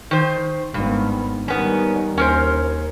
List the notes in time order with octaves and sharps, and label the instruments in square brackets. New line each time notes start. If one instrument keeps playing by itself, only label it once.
[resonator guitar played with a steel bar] D#3 C5
[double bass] G#1 B3 [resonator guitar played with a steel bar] G2
[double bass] D#3 G3 [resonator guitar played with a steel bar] B3 C#4
[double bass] D#2 [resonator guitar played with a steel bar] C#4 A#4 C5